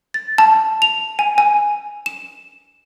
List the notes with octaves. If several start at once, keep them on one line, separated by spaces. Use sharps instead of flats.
A6
A5
F7
G#5
G#5
E7